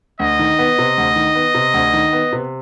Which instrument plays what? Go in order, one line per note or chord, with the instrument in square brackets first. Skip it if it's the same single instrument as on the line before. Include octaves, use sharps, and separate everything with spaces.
[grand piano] D2 [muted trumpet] D#5
[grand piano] D#3
B3
C3
D2
D#3
B3
C3
D2
D#3
B3
C3